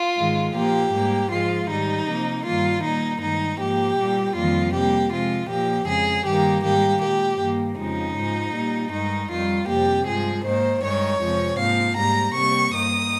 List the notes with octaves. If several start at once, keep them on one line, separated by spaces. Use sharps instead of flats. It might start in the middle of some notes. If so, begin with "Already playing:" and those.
Already playing: F4
G#2 D#3 G#3
A#2 F3 A#3 G4
G#2 G3 A#3
G#2 F3 G#3 F4
G#2 D#3 G3 D#4
C3 F3 A#3
G2 D#3 G3 A#3 F4
A#2 G3 A#3 D#4
G2 D#3 G#3 D#4
G#2 F3 A#3 G4
A#2 G3 A#3
F2 D#3 G3 A#3 F4
C3 G3 A#3 G4
C3 F3 G#3 F4
A#2 F3 A#3 G4
F2 C#3 G#3 G#4
G2 D#3 G3 A#3 G4
G#2 D#3 G3 A#3 G4
A#2 G#3 G4
G2 D#3 A#3
F2 C#3 F3 G#3 D#4
G#2 F3 G#3
A#2 G3 A#3
G2 D#3 G#3 D#4
F2 D#3 G3 F4
F2 C3 G3 A#3 G4
G2 F3 G#3 G#4
G#2 D#3 A#3 C5
G2 D#3 G#3 C#5
F2 C3 F3 G#3
G#2 F3 A#3 F5
G#2 G3 A#3 A#5
C3 G3 A#3 C#6
G2 D#3 A#3 D#6